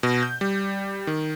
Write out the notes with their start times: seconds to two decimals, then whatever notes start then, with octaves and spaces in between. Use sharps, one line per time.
0.03 B2
0.23 G6
0.41 G3
1.07 D#3